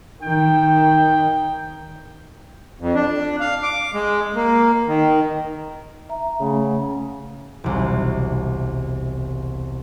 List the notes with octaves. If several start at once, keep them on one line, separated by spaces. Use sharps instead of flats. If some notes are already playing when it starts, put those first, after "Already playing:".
D#3 G5
F2
D4
F5
D6
G#3
A#3
D#3
E5 A#5
C#3 A3 G#4 F#5
E1 C2